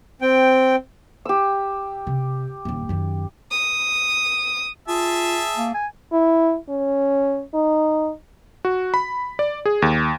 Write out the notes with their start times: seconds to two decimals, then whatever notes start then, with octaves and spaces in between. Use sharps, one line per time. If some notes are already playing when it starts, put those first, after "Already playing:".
0.22 C4 G5
1.25 G4 E6
2.07 C3
2.65 D#1 D#2
2.89 F#2 D#3
3.51 D#6
4.88 F4 G#4 E5 A5
5.57 A#3
5.74 G#5
6.12 E4
6.69 C#4
7.54 D#4
8.65 F#4
8.94 B5
9.39 D5
9.66 G#4
9.82 D#2